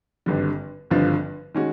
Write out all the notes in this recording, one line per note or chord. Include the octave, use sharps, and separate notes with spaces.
G#1 G2 D3 G3
G#1 G2 D3 F3
D#3 G#3 C#4 F#4